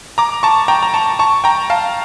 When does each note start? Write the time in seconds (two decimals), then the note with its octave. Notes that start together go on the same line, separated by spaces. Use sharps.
0.18 A#5 D6
0.43 A5 C#6
0.68 G5 A#5
0.83 A#5
0.94 A5 C#6
1.19 A5 C#6
1.44 G5 A#5
1.70 F5 A5